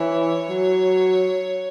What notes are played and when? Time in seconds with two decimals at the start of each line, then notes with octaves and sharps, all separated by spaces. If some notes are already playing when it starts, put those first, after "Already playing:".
Already playing: E3 C#5
0.49 F#3